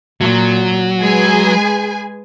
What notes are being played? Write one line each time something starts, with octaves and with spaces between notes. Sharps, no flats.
A#2 F#3
G#3 G#4 B4 G#5